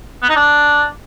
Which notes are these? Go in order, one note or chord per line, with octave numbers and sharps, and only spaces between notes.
B3
D#4
D4